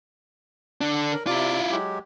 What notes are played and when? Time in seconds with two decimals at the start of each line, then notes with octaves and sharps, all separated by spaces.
0.81 D3 D4
1.12 A#4
1.27 C3 E4 F4 D5 D6
1.71 F#3 G#3 G4